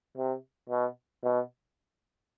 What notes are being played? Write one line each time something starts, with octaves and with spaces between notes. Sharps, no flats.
C3
B2
B2